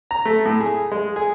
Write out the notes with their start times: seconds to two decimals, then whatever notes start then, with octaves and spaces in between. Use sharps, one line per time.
0.11 A#5
0.25 A3
0.45 A2
0.61 G#4
0.92 G#3
1.16 G#4